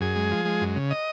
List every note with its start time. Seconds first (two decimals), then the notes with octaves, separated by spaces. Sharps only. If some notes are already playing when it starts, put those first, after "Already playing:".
0.01 F#2 G#4
0.15 G#3
0.31 F3
0.45 G#3
0.61 F#2
0.76 C#3
0.91 D#5